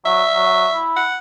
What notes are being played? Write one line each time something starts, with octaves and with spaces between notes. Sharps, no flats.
F#3 E5
F#3
E4
F#5